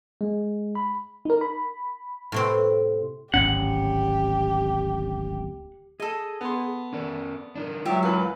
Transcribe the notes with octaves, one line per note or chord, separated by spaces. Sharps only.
G#3
B5
D#4 A#4
B5
A2 C3 C4
D1 G#1 C#4 G4 F#5
G#4 A4 D#5
B3 C6
C#4 A#4 D5
D4 D#4 A#4
F#3 G#3 F4 G4 E5
F#2 E3 B4 F5